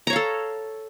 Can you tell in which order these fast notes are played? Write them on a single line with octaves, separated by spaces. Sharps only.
A#5 C#5 F5 A4